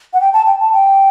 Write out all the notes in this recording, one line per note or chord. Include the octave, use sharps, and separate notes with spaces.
F#5
G5
A5
G5
A5
G5